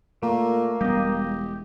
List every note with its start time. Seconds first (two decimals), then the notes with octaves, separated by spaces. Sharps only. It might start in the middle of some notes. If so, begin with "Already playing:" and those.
0.23 A#2 A3 A#3
0.81 E1 G3 B3 G4 D#5